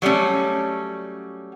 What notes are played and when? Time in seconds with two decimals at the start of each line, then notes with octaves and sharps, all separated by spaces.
0.02 F#3 G3 A3 C#4